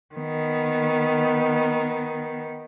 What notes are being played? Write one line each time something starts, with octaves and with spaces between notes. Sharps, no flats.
D#3 B3